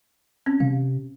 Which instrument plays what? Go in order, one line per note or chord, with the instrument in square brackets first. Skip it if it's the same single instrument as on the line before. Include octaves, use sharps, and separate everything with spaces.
[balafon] C4 C#4
[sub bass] C3 [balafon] F5